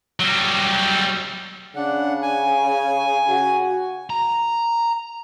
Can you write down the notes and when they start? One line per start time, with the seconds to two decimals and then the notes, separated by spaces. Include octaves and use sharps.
0.20 F#3 G3
1.76 C#3 D4 F#5
2.22 G#5
3.29 F#4
4.10 A#5